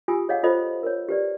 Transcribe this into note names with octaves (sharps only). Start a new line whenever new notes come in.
F4 G4 G#5 D#6 E6
G#4 C#5 D#5 F5 F#5
F4 A4 C5 D#5 B5
A#4 C#5
G4 B4 D5